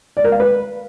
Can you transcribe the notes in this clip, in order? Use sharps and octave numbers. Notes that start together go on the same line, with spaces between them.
D5
A#4
F5
B4